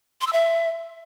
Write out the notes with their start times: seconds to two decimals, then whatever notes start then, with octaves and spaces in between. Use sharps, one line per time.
0.21 C6
0.27 E6
0.33 E5